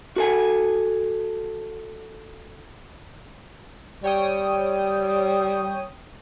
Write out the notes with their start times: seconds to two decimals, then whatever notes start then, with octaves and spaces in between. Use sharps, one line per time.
0.16 F#4 A4 G#5
4.04 G3 C#5 G5 D#6